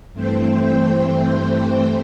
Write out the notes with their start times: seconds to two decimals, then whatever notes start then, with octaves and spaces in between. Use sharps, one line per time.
0.13 G2 E3 A3 C4 C5 G5